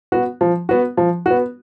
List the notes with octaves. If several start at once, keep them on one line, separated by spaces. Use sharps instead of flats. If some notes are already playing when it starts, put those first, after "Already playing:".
B3 F#4
F3
B3 F#4
F3
B3 F#4